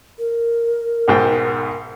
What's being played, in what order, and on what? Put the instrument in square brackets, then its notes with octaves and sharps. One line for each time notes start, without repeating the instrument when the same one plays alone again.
[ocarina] A#4
[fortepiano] B1 G#2 G5